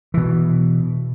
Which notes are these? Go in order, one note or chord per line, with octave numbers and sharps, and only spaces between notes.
B2 E3